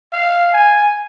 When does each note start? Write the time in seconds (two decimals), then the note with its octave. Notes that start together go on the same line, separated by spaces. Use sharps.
0.13 F5
0.53 G#5